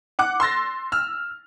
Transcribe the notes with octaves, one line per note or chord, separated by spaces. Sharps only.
F#5 D6 F#6
C6 E6 A6 A#6
E6 F6